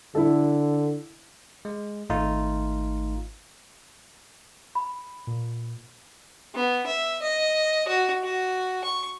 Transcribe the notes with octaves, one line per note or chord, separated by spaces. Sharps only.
D3 E4 A4
G#3
G#1 A3 D#4 F4
B5
A#2
B3
E5
D#5
F#4
F#4
C#6